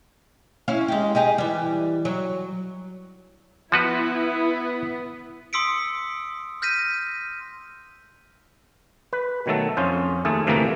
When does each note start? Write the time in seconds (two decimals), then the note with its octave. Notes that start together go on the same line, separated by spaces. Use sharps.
0.68 C#4 E4 F5
0.88 G#3 G4
1.15 D#4 G4 G#4
1.38 E3 G3
2.05 F#3
3.72 F3 B3 E4 F#4 B4
5.53 C6 D#6 E6 B6 C#7 D7
6.62 F6 G6 A#6 B6 D#7
9.13 B4
9.46 B2 D#3 F#3 A3 A4
9.77 F2 C#4 F4 C5
10.25 D#2 A3 G#4 A4
10.47 D2 G2 C3 E3 A3 A#3